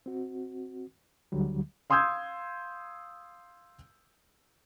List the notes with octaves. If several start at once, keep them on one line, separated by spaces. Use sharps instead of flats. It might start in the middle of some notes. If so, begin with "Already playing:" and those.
C4 F#4
D2 D3 F#3 G3
F5 C6 D#6 E6 G6 G#6